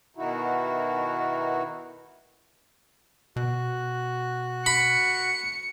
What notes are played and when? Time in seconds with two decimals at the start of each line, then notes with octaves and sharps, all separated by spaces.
0.17 B2 D#3 D#4 E4 F#4
3.36 B2 F#4 F#6
4.66 B5 C#7